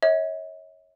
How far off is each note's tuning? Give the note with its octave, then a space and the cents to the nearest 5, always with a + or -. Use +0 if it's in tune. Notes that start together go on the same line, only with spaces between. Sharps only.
C#5 -10 E5 -45